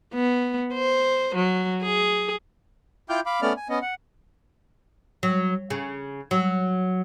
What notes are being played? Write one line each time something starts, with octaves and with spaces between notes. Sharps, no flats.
B3
C5
F#3
G#4
E4 F4 G5 D6 F6 G6
F5 B5 D6
A3 B3 C#4 D5 F6
G#5
B3 C#4 D#5
F#5
F#3
C#3
F#3